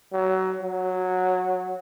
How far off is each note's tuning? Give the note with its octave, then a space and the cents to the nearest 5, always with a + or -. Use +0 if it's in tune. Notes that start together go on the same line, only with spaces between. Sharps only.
F#3 +25
F#3 -10